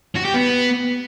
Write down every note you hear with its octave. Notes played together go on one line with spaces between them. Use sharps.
F#4
G4
B3